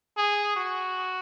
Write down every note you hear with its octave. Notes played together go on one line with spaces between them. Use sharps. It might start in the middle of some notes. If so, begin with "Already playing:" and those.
G#4
F#4